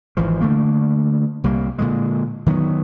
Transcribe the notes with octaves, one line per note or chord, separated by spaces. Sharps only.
G#1 E3 F3
D3 A3 A#3
C2 G3 A#3
A#2 D3 G#3
D#3 F#3 A#3 B3